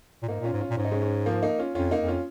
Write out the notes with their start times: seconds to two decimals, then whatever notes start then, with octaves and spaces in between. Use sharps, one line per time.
0.22 A#2
0.28 G#2 A#3 D#4
0.40 A#2
0.44 C#4 F4
0.53 G#2
0.60 C#4 F4
0.70 A#2
0.77 G#2 C#4
0.85 D#4
0.91 G#3 C#4
1.02 G#3 C#4
1.26 F3 A#3
1.43 A#3 D#4
1.59 C#4 F4
1.75 F2 C#4 F4
1.91 A#3 D#4
2.00 F2
2.08 C#4 F4